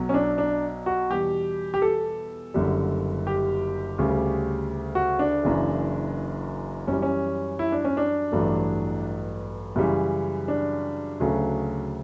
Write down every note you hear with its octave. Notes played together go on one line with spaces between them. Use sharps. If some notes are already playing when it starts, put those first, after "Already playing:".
Already playing: B1 B2 F#3
C#4
D4
D4
F#4
E2 B2 G3 G4
G4
A4
F#1 F#2 D3 G3
G4
D2 C#3 G3
F#4
D4
F#1 F#2 C#3 E3
F#2 E3 G3 C#4
C#4
E4
D4
C#4
D4
A1 G2 F#3 A3
F#2 C#3 E3 G3
D4
D2 C#3 F#3 A3